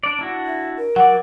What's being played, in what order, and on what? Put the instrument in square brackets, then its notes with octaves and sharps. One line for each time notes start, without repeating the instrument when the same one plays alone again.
[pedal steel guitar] D4 D5
D4 E4 F#4
[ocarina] E5
A#4
[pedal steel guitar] F#3 D5 [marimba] F#5